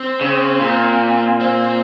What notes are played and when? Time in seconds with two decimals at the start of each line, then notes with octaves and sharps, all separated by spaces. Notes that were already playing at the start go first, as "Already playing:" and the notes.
Already playing: C4
0.21 C#3
0.61 A#2
1.40 C4